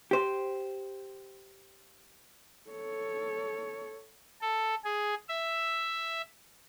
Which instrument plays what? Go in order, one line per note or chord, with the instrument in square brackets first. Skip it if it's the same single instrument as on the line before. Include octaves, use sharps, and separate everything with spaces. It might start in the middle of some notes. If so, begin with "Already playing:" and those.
[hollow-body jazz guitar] G4 C5
[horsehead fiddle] A4 C#5
[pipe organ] A4
G#4
E5